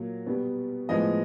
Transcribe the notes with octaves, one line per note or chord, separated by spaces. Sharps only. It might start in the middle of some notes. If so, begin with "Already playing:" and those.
Already playing: A#2 F#3 A#3
B2 G3 B3
A2 F3 G#3 B3 D#5